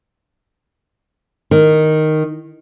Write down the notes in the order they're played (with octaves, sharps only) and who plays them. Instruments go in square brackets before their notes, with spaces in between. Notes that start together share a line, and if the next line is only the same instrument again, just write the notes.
[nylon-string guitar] D#3